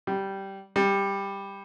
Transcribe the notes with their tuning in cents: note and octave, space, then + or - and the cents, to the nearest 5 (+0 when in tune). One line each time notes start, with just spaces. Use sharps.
G3 -10
G3 +10